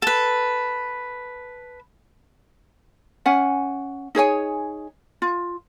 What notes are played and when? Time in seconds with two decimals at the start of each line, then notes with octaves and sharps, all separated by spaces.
0.02 A4 B4
3.26 C#4 F#5 G#5
4.15 D#4 G#4 C#5 G#5
5.22 F4